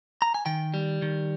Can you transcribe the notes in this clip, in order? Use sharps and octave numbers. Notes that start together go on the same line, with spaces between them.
A#5
G#5
D#3 G5
G3
D#3